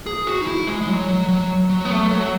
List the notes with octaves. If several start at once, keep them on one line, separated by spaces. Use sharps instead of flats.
G#4
F#4
D#4
E4
G#3
G#3
F#3
F#3
F#3
F#3
B3
A3
F#3